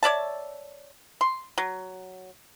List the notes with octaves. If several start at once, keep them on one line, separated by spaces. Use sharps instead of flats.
C#5 D5 E5 A5
C6
F#3